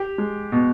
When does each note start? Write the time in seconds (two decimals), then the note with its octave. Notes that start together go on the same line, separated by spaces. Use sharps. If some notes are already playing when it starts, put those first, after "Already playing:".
Already playing: G4
0.18 G#3
0.52 B2